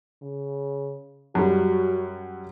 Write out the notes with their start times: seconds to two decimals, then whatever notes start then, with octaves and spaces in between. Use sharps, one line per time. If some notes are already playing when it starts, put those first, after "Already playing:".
0.22 C#3
1.35 F#2 G3 F#4